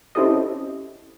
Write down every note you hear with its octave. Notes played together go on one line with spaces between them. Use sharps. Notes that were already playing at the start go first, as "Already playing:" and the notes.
C4 C#4 E4 G4 A4 D#5